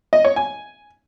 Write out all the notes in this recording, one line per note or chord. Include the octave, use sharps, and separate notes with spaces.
D#5
C#5
G#5